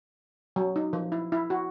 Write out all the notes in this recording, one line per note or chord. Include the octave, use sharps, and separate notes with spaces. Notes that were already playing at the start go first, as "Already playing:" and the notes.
F#3
D#4
F3
E4
E4
F#4